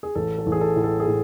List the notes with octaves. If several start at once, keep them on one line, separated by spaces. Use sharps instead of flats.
G#4
A1 A4
A4
A1
G#4
A4
A2
A4
G#4
A2 A4